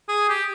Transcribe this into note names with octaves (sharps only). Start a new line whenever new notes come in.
G#4
G4